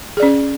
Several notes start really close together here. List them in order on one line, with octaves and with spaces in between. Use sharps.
G#4 D5 C#4